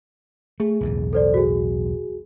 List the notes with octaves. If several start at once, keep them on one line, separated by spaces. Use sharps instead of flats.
A3 G#4
B1 E2 A2
A4 C5 D5
F#4 G#4